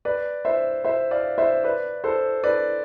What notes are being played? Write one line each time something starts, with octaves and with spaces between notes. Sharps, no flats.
B4 D5
C5 E5
C5 E5
D5 F5
C5 E5
B4 D5
A4 C5
B4 D5